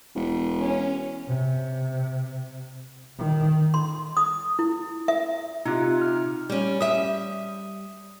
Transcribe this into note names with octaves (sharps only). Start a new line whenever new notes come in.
E1
C#4
C3
D#3
C6
D#6
E4
E5
C3 D#4 F4 G4
F6
G3 C#4
G3 E5 D#6